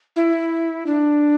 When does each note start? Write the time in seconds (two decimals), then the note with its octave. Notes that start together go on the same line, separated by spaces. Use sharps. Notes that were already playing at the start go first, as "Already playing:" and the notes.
0.16 E4
0.86 D4